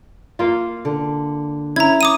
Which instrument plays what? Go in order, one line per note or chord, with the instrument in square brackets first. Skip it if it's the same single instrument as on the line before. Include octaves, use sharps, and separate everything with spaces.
[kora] A#3 F4
[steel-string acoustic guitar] D3
[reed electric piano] C#4 [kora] E4 [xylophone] A#5 G#6
[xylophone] D6 D#6 D#7